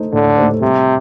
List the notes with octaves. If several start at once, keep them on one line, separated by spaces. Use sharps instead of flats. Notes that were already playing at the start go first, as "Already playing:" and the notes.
Already playing: A3 D#4 A4 C5
A2 D3
A3 D#4 A4 C5
C3 G3